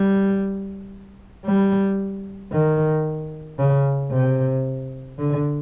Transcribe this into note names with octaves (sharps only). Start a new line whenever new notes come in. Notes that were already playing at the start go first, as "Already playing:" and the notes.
Already playing: G3
G3
D#3
C#3
C3
D3